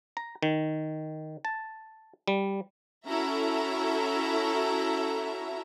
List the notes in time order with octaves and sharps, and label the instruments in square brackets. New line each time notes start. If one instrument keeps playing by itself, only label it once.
[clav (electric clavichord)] A#5
D#3
A5
G3
[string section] C#4 E4 F#4 A4 E5 A#5